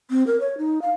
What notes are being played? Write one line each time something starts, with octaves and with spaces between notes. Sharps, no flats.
C4
A#4
C#5
D#4
F5